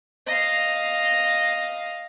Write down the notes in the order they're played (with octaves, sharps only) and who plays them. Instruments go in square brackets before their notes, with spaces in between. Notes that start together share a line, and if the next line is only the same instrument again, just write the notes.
[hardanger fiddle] D#5 F5